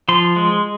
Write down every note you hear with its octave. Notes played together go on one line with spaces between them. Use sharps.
F3 C6
G#3